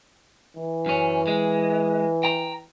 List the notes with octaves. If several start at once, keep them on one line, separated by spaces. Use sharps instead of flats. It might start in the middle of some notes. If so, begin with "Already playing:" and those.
E3
F#2 C#4
G#3
G5 A#5